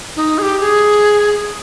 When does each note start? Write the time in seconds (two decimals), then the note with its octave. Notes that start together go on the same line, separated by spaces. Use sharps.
0.16 D#4
0.38 G#4
0.42 G4
0.60 G#4